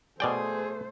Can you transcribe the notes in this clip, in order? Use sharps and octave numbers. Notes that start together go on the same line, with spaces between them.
B2 A3 G#4 C5 D5 G5